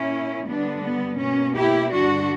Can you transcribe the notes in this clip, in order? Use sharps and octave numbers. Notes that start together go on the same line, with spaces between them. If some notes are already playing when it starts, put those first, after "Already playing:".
Already playing: A#2 A#3 C#4 E4
G2 D3 G3 B3 D4
B3
B2 A#3 C#4
E4 G4
G2 D3 G3 D4 F#4